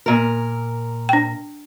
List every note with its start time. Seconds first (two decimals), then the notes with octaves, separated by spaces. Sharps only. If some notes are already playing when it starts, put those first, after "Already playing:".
0.06 A#2 A#4
1.09 D4 G5